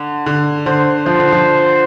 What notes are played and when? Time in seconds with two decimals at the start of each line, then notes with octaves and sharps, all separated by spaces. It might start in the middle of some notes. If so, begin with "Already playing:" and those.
Already playing: D3
0.26 D3
0.66 D3 C5
1.06 F3 C5
1.19 D3
1.33 F3